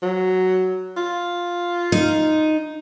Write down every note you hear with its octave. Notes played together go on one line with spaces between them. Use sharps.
F#3
F4
D#4